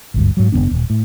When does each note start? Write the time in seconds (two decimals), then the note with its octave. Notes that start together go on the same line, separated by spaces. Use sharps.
0.14 G#1 D2 G2
0.37 G#2 F#3
0.52 F#1 A#2 B3 D4
0.71 D#1
0.90 A2